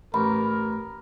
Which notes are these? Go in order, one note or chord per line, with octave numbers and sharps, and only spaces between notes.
A1 A#4 B5